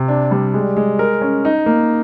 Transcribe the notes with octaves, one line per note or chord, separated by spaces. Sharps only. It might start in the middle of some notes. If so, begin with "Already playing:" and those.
Already playing: C3
D4
G3
G#3
G#3
A#4
C#4
D#4
A#3